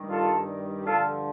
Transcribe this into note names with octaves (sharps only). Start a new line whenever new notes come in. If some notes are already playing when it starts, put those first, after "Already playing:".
Already playing: G2 D#3 G3
F4 A4
G2 D3 F3 F4 A4